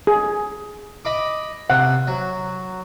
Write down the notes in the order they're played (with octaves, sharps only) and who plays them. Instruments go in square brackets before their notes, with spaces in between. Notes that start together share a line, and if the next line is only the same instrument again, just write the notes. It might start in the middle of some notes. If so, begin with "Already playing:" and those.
[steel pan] G#4
[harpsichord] D#5 B5 D6
[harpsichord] C3 [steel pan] F#5
[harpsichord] F#3